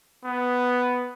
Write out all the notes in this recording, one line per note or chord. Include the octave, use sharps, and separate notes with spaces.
B3